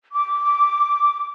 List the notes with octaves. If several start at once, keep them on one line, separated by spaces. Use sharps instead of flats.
D6